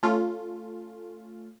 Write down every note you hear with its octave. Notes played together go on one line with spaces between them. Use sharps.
A3 C#4 F4